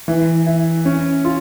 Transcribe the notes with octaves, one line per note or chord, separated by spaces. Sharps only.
E3
E4
C#4
F4